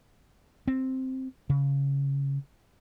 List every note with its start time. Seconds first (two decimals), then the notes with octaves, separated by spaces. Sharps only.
0.68 C4
1.50 C#3